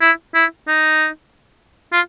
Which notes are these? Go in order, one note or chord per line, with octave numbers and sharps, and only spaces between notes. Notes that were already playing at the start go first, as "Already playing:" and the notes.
E4
E4
D#4
F4